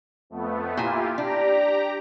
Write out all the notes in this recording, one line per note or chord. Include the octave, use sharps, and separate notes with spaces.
F2 A3 B3
A#2 E4 F4 G4 G#5
D4 G4 A#5